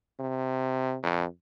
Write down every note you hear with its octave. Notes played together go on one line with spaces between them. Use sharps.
C3
F2